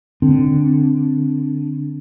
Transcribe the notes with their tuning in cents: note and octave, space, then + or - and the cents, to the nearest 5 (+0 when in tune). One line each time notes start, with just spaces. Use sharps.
D3 +0 C4 +0